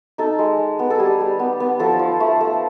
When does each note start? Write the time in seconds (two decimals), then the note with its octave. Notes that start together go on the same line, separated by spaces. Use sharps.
0.18 D#4 A4
0.39 G#3
0.59 G#3
0.79 B3
0.90 A4
0.99 G3 G#4
1.20 G3
1.39 B3
1.60 B3
1.79 F3 A4
1.99 F3
2.20 A3
2.41 A3